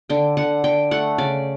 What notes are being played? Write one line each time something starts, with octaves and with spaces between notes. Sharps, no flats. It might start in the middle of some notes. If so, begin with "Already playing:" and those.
D3 G5
D3 F#5
D3 G5
A3 F#5
C#3 D5